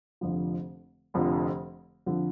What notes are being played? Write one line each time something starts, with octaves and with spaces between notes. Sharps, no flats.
F1 F2 D3 F3
F1 F2 D3 F3
F2 D3 F3